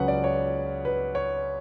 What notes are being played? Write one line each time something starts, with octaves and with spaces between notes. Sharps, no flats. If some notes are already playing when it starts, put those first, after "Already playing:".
Already playing: C#2 C#3 F#3 C#4 B4 F#5
D5
C#5
B4
C#5